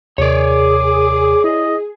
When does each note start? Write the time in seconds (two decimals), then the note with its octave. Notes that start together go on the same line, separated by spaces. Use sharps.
0.18 D#2 C3 G#4 A#4 C#5 D5 D6
1.44 E4 D#5